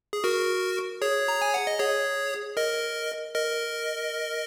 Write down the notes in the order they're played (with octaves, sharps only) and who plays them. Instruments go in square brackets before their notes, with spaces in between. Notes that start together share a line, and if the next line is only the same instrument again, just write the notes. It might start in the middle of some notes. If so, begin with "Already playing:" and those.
[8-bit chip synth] G#4
F#4 A#4
G#4 C#5
A#5
G#5
F#5
D#5
G#4 C#5
A#4 D#5
A#4 D#5